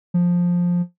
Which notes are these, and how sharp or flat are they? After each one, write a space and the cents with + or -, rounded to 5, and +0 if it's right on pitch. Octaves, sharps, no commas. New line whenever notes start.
F3 +10